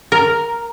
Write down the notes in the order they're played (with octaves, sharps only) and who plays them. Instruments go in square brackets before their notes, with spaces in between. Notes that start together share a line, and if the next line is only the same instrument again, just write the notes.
[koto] A#4